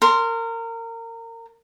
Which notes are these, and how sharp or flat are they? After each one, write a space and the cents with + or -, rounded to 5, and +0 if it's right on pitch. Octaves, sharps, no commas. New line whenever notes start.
A#4 -25 C6 +0